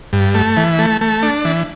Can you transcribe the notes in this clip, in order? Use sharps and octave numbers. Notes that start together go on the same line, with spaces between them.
G2
A3
E3
A3
A3
D4
E3